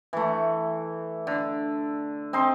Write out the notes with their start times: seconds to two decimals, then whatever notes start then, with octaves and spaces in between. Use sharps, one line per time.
0.13 E3 A3
1.27 D3
2.33 C4 D#4 C6